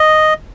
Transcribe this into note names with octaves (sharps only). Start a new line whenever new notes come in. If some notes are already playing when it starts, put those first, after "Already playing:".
Already playing: D#5